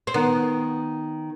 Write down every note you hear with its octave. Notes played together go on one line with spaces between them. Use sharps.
C4
D#3 B3